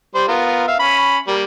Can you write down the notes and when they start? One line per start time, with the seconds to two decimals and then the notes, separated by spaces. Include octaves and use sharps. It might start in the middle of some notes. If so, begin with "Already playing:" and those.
0.15 G3 C5
0.28 B3 F4 A#4
0.68 E5 F5
0.79 C#4 B5
1.28 G3 A#3